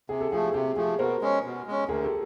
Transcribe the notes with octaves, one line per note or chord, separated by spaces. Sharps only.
C3 G#4
G4 A4
F3 A3 G#4
G4
C3 G4
F3 A3 G#4
B2 A#4 C5
G#3 C#4
B2
G#3 C#4
D2 G#4 A#4
G4 A4